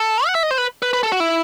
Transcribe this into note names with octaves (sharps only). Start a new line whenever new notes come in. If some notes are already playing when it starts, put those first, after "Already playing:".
Already playing: A4
F#5
E5
D#5
C5
B4
B4
B4
A4
F#4
E4